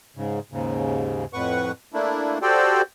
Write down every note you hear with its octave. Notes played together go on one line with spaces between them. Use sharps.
G#2 C#3
D#2 G#2 C#3
F2 A2 B4 F#5 C#6
A3 A#3 D4 E4
F#4 G4 A4 C5 D5 G5